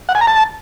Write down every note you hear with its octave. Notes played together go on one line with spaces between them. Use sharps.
F#5
G#5
A#5
A5